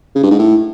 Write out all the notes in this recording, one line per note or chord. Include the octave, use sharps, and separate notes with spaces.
C#3
G2
G#2
A2